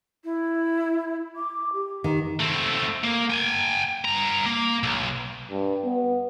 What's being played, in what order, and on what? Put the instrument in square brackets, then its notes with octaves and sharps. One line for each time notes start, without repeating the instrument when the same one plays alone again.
[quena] E4
[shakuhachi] D6
G4
[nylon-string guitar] D#3
[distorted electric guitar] A3 C4
A#3
G5 G#5
G2 A#5
A#3
B1
[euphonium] G2
B3